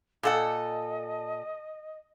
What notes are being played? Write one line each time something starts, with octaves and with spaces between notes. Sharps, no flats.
A#2 A4 D#5 F#5